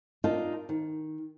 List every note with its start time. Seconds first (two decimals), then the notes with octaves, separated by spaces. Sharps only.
0.24 D4 D#4 F4 A#4 A5
0.69 D#3